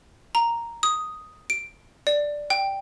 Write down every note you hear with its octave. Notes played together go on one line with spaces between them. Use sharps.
A#5
D#6
D7
D5
G5